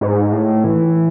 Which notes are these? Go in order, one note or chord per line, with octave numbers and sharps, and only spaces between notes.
G#2
A2
E3